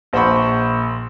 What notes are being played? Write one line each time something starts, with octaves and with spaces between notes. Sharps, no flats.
A#1 C5 F#5 B5 C#6